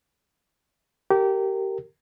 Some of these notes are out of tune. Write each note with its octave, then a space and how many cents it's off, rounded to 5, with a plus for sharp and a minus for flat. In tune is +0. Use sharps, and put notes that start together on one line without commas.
G4 -20 A#4 -20